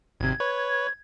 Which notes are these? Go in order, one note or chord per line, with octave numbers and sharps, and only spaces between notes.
G#1 C3 G#6
B4 C#5